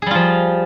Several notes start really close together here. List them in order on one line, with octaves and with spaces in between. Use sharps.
G#4 G3 F4 F3